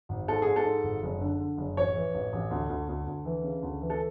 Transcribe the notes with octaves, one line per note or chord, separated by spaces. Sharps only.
G#1
G#2 A4
G#2 G#4
A4
G#2
G#1
F#1
D3
D3
F#1
A1 C#5
E3
A1
A1
D2
D2
D2
D2
E3
C#3
D2
E3
A4